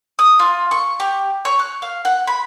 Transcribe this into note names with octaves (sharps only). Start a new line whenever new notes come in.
D#6
F4
C#6
G4
C#5
F#6
F5
F#5
B5